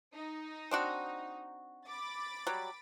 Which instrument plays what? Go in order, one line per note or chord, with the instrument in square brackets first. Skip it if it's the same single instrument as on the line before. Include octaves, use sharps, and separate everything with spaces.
[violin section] D#4
[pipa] C4 D4 F#4
[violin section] B5 D6 A6
[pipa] F#3 G3